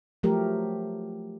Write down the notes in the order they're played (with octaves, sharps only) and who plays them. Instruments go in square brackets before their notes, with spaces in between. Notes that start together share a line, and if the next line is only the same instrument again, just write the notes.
[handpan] F3 F#3 A3 G4 A#4